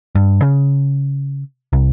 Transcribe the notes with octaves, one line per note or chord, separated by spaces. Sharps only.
G2
C#3
C2